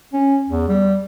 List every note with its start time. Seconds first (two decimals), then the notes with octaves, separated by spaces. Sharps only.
0.13 C#4
0.49 E2
0.68 G3